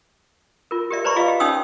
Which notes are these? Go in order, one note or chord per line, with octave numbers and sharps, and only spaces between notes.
F4 A#4
G4 A#4 D5 E5
B4 C5 D5 A#5 B5 C#6
F4 G#4 D#5 F5
G4
C#4 D#4 C#5 G5 D#6 E6